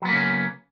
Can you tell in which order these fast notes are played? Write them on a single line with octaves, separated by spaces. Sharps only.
F#3 B3 A#3 C#3 C#4